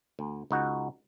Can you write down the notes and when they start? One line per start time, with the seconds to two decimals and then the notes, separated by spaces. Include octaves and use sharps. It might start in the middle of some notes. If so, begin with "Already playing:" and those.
0.19 D2
0.51 C#2 D#4 F#4